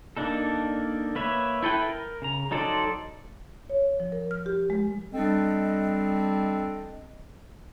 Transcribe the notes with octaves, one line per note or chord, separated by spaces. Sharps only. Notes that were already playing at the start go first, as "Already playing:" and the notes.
A#3 D4 D#4 A4
A#3 B4 C#5 E5
E4 A4 B4 G5
A#4
C#3 A#5
F#3 D#4 A4 C5 D5
C#5
F3
A#4
F6
G4
G#3
G3 C4 D4 A4 D#5